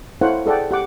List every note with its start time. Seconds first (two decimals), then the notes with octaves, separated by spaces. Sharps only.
0.21 E4 A4 C5 C#5 F5 F#5
0.46 G#4 A4 D5 F#5 G5
0.71 G4 F#5 D6